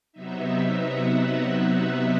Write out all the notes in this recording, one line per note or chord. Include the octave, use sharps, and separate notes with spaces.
C3 F#3 B3 D#4 E5
F#5